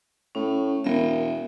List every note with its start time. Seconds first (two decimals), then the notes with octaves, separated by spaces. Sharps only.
0.35 A2 C#4
0.84 E1 A#4 E5